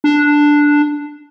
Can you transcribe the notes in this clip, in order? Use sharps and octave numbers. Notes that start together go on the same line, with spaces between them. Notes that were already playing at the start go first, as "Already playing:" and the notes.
D4